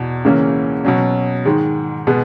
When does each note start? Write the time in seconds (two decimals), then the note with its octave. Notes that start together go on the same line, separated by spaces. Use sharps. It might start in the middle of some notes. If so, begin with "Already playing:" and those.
Already playing: E2 B2
0.24 C#2 C#3 E3 A#3 C#4
0.85 B2 F#3 C#4
1.45 G#2 D#3 G#3
2.07 B2 G#3 B3